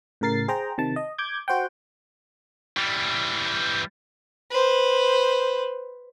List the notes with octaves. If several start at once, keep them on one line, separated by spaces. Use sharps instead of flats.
A2 C#3 A#4 A6 C7
G#4 C5 G5 A#5
C3 D#3 A5
D#5
D6 G6 G#6
F#4 C5 F#5 G5
E3 G3
B4 C5